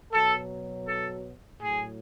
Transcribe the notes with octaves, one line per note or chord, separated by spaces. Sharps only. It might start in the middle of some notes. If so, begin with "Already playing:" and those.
B2 F#3 A4
A4
A2 F#3 G#4